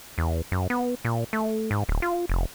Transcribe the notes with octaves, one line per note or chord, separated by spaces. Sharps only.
E2
F#2
B3
A#2
A3
G#2
D1
F4
F1